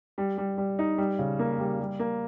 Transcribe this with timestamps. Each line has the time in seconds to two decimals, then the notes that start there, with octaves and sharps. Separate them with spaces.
0.18 G3
0.38 G3
0.58 G3
0.79 D#4
0.98 G3
1.19 C#3
1.39 A#3
1.59 G3
1.79 G3
1.99 A#3